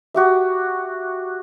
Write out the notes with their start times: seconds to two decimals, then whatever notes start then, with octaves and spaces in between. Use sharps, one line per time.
0.14 F#4 G4 E5